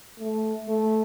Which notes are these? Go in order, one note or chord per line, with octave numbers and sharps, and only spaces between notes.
A3
A3